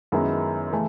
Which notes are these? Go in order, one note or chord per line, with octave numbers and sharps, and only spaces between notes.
F#2 D#3 G#3 B3 E4
C#3 E3 A3